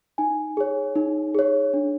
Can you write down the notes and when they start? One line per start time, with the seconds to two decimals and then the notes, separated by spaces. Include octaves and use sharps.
0.18 D#4 G#5
0.57 G#4 C#5
0.96 D#4
1.35 G#4 C#5
1.74 D4